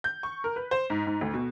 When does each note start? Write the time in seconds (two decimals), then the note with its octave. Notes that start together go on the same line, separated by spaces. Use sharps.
0.04 G6
0.23 C#6
0.44 A#4
0.56 B4
0.71 C5
0.90 G#2
1.07 G#2
1.21 D2
1.34 B2